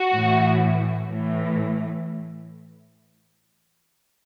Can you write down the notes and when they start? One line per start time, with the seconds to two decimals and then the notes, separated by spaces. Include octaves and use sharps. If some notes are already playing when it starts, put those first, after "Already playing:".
Already playing: F#4
0.15 A2 E3
1.09 A2 E3